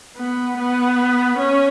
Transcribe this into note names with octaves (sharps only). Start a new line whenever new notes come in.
B3
B3
C#4